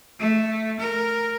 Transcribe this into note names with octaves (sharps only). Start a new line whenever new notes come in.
A3
A#4